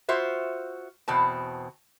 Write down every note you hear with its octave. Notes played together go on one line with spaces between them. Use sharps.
F4 F#4 C5 E5
E2 B2 C4 A5